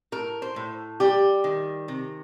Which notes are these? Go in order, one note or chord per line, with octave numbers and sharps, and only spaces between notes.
A2 A#4
C5
A2
G3 G4
D#3
C3